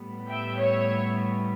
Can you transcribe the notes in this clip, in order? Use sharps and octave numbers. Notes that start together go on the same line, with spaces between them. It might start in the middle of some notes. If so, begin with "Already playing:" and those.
Already playing: A2 G3 B3
E5 G5
C#5 E5